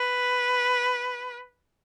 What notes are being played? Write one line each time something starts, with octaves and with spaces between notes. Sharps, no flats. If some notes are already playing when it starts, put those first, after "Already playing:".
Already playing: B4